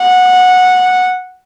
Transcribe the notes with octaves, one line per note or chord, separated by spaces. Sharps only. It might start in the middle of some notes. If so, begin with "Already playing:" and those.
Already playing: F#5